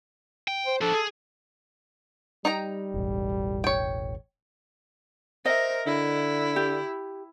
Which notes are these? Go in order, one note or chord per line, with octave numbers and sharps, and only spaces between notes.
G5
C5
F3 D4 A4
G#4
G3 D#4 G5 A#5
E1 A1
C#5 G5
A#4 C5 D#5 E5
D3 E4
G4